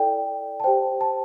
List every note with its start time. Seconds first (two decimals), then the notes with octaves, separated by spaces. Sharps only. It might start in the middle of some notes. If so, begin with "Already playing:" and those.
Already playing: E4 A4 D5 G5
0.60 A5
0.64 G4 C5 G5
1.01 A5